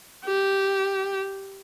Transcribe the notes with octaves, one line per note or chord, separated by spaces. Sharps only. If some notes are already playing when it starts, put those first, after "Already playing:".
G4